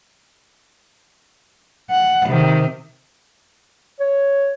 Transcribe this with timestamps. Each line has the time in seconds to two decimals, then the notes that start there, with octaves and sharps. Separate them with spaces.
1.91 F#5
2.28 C3 D#3
4.00 C#5